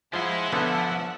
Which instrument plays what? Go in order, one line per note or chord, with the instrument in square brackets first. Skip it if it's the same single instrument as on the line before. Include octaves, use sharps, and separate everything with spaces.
[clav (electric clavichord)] F3 E4 [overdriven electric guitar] G#3 C6 [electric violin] E5 F#5
[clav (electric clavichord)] D3 B3 C#4 [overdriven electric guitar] F3